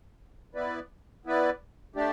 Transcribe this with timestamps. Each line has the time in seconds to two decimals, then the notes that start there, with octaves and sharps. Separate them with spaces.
0.55 B3 E4 B4 D5
1.25 B3 E4 B4 D5
1.95 A3 D4 G4 D5